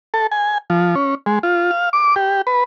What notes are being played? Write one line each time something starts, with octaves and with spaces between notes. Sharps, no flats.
A4
G#5
F3
C#4
G#3
F4
F5
D6
G4
B4